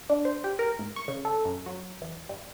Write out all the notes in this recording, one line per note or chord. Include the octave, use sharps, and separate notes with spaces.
D4
C5
G4
A#4
G#2
C#6
C#3
A4
F#2
F#3
E2
G2